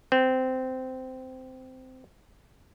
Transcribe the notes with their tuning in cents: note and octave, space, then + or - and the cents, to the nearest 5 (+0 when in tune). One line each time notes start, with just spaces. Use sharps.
C4 -15